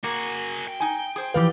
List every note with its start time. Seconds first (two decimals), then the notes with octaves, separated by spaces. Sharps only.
0.04 A#3 F#4 G#4
0.67 G5
0.80 D#4 G#5
1.16 G#4 C5
1.34 E3 F3 G4 B4 D5 F5